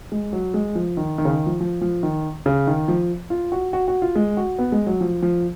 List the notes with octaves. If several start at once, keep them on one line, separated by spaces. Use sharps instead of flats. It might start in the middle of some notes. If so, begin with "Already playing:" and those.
G#3
F#3
G#3
F3
D#3
D#3
C#3
D#3
F3
F3
F3
D#3
C#3
D#3
F3
F4
F#4
F#4
F#4
F4
G#3
F#4
B3
G#3
F#3
F3
F3